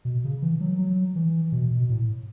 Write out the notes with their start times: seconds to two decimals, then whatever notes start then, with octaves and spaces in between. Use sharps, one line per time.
0.05 B2
0.24 C#3
0.42 E3
0.61 F#3
0.79 F#3
1.16 E3
1.52 B2
1.71 B2
1.90 A2